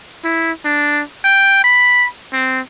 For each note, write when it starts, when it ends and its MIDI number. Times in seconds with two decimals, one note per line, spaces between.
0.24 0.51 64
0.65 1.03 62
1.24 1.62 79
1.64 2.07 83
2.33 2.60 60